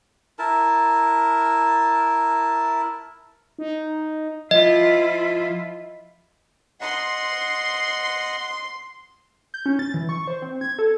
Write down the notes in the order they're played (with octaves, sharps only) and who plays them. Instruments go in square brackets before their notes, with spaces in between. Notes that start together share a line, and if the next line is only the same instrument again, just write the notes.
[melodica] E4 A#4 A5
[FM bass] D#4
[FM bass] F3 [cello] E4 F4 [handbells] D#5
[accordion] D#5 F#5 [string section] C6
[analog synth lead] G6
C#4
A6
E3
C#6
C5
C4
G#6
A4